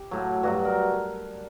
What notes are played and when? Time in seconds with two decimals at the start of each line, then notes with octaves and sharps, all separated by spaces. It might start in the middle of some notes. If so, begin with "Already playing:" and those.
Already playing: G4
0.11 A2 F#3
0.43 G2 F#3 F#4
0.65 A#4